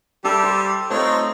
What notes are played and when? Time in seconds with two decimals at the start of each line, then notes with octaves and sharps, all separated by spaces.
0.24 G3 G4 A4 E5 B5
0.44 C5
0.90 A3 C4 D#4 F4 C#5